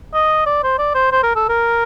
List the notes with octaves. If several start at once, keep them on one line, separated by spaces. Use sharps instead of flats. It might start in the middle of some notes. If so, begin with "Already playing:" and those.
D#5
D5
C5
D5
C5
C5
A#4
A4
A#4